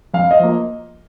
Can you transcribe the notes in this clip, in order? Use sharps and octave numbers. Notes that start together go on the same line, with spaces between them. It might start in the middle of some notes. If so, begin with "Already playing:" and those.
F2 F5
D#5
F3 A#3